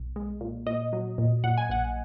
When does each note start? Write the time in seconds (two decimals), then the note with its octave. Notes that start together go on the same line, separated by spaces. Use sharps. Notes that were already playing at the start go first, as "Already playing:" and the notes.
Already playing: B1
0.16 G#3
0.41 A#2
0.66 A#2 D#5
0.93 F#3
1.18 A#2
1.44 A#2 F#5
1.57 G#5
1.69 A#1 F#5